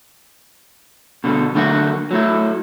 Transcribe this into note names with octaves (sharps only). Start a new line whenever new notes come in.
B2 D3 G3
D3 F#3 A3 A#3 F#4
F#3 A3 E4